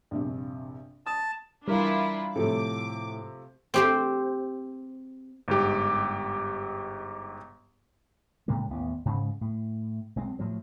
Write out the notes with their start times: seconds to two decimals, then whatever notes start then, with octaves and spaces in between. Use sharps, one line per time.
0.11 A#1 G2 C3
1.06 A5 D#6
1.68 E3 G3 D4 E4 F4 A#4
2.36 A2 C3 F3 A3 A4 D6
3.74 C4 G4 C5
5.48 G1 G#2 G4
8.48 A2 C#3 G#3 A#3
8.70 A1 D#2 B3
9.05 G#2 C#3 G#3
9.41 A2
10.16 B1 G#3 C4
10.39 A2 F3 F#3